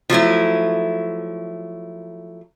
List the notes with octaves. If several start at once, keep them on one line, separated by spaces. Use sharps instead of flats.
F3 F#3 A3 E4